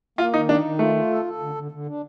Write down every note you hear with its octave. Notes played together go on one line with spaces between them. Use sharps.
A#3 F4
D#3 D#4
D4 D#4
D#3
A3 F4
F4
A4
A4
D3
D3
D3
D4